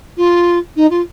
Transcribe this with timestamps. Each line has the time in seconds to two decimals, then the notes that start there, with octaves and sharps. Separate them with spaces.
0.17 F4
0.76 D#4
0.90 F4